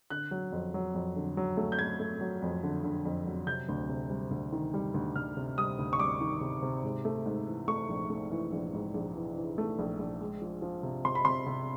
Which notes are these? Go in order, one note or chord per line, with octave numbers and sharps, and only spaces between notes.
D3 F#6
F#3
F2
F#3
F2
D3
F#3
A3
G6
A3 G#6
A3
F#3
F2
D3
D3
F2
F#3
C3 G6
D2
C3
G3
D2
D#3
G3
D2
D2 F6
C3
G3 D#6
D2
C#6
G3 D6
D#3
C3
C3
G#2
A3
G#2
E3
A3 C#6
A#1
A3
E3
A#1
G#2
A#1
E3
E3
A3
A#1
A#1
G#3
F3
F3
C3
C3 C6
B5
C3 C6
C3